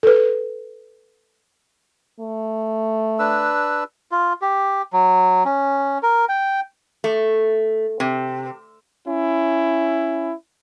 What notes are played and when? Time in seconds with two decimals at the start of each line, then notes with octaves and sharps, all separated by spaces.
0.03 A4 B4
2.20 A3
3.19 D4 B4 E6
4.12 F4
4.42 G4
4.93 F#3
5.45 C#4
6.03 A#4
6.29 G5
7.04 A3
8.00 C3
9.08 C#4 E4